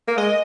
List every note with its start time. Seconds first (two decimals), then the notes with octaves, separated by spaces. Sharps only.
0.08 A#3
0.17 G#3 D#5